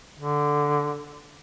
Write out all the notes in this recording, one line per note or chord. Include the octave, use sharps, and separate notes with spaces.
D3